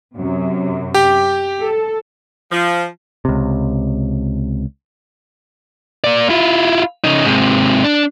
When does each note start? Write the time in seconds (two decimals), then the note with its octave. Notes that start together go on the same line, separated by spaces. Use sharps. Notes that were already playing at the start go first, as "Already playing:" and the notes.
0.14 F#2 C3
0.94 G4 G5
1.60 A4
2.51 F3
3.25 C#2 C3
6.04 A#3 D5
6.29 E4 F4
7.04 C#3 D#4
7.26 G#2 C3
7.84 D4